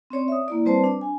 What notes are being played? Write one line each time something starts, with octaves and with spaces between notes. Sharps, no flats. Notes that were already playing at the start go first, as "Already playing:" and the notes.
C4 C#4 C#5 D5
E5 D#6
A#3 E4 D5
G3 C4 B4 C5 D5 A5
D4
G#5